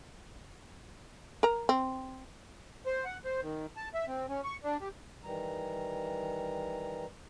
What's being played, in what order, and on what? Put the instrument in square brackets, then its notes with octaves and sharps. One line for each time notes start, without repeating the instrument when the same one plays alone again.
[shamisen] A#4 A#5
C4
[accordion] C5
F#5
C5
D#3
A5
E5
C4
C#4
C#6
D4
G4
[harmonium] D#3 E3 G3 A#5